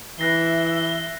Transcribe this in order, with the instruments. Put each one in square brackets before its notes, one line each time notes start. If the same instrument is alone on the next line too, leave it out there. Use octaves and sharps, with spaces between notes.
[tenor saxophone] E3 [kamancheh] E5 [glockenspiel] F#6 A#6 C7 [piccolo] G7